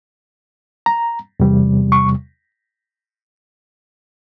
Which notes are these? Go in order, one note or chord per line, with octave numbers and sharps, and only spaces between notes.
A#5
E2 C3 G3
C#6